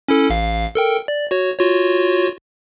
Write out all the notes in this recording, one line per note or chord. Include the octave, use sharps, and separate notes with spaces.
C#4 E4 A4
A1 F5
A4 A#4 G5
D5
F#4 C#5
F4 F#4 C#5